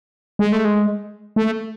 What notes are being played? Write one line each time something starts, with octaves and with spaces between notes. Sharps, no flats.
G#3
A3
G#3
A3